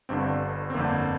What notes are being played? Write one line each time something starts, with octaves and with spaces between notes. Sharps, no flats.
G1 G2 D3 C4
C4
G1 F2 D3 A#3